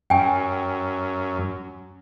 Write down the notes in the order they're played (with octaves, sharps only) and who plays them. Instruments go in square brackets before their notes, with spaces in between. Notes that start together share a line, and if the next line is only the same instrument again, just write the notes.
[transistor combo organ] F#2 [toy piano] G5 G#5